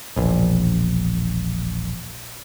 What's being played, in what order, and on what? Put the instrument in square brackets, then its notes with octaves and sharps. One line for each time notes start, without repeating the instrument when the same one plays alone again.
[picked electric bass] E1 A#1